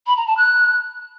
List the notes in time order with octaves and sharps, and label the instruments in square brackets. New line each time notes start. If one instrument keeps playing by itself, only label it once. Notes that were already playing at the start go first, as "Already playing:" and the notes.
[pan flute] B5
A#5
A5
F#6